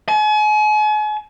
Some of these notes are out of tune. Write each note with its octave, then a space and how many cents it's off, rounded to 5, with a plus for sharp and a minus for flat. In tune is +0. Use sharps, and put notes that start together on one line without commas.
G#5 +40